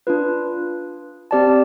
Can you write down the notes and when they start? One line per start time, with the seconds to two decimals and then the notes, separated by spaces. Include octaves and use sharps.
0.07 D4 F4 B4
1.31 C4 G4 D5 A5